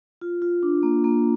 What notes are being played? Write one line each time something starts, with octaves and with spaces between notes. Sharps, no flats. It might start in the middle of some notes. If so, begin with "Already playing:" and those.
F4
F4
D4
A#3
A#3